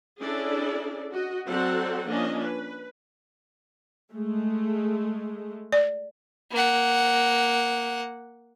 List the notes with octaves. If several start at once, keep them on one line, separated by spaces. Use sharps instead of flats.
C#4 D4 E4 G#4 A4 D5
F#4 D#5
F#3 C4 F#4 A4 D5 F#5
F3 A#3 C#4 D4 D#5
B4
G#3 A3
D5
A#3 F#5